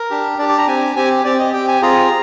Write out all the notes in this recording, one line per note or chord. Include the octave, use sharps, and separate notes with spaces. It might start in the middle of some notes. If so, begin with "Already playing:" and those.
Already playing: A#4
D4 G4
D4 G4 D5
D5
A#5
C4 G4 G#5
C4 G4 G#5
C4 G4 D5
D#5
C4 G4 G5
G#5
C4 F4 G#4 A#5